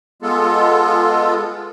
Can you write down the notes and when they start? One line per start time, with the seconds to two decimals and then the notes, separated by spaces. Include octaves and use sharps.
0.22 G#3 B3 F4 A4